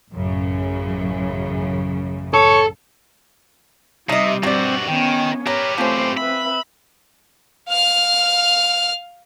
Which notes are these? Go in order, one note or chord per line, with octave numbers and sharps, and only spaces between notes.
A1 F#2 C#3
A4 C#5
C3 G3 D#4 D#5 E5
G2 C3 C4 F#4 D5
D#3 B3 C#4 G5
G4 A#4 B4 C#5
F3 A3 C4 C#4 C5
B4 E5 B5
F5 F6